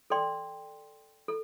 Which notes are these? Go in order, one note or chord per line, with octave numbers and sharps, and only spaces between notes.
A4 D5 G5 C6
A4